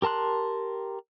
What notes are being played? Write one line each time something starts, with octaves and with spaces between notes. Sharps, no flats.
G4 A#4 A5 C6 F#6